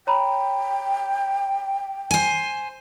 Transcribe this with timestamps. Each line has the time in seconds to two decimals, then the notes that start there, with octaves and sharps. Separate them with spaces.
0.07 C#5 G5 A#5 B5
2.11 C5 G#5